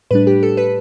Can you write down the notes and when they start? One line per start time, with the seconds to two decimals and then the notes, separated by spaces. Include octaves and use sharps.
0.11 A2 G3 D4 B4
0.27 G4
0.43 A4
0.57 B4